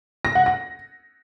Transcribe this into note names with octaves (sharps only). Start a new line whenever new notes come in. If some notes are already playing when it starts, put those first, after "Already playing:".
A#6
F#5
A#6